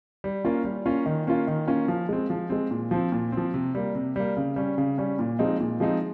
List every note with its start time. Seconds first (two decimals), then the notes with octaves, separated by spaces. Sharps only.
0.24 G3
0.45 A#3 C#4 F4
0.65 G3
0.85 A#3 C#4 F4
1.06 D#3
1.27 A#3 C#4 F4
1.47 D#3
1.68 A#3 C#4 F4
1.88 F3
2.09 G#3 C4
2.30 F3
2.50 G#3 C4
2.71 A#2
2.91 F3 C4
3.12 A#2
3.32 C4
3.37 F3
3.54 C3
3.75 G3 A#3
3.95 C3
4.16 G3 A#3
4.37 C#3
4.56 G3 C#4
4.78 C#3
4.98 G3 C#4
5.19 A#2
5.39 F3 G#3 C4 D#4
5.60 A#2
5.80 F3 G#3 C4 D#4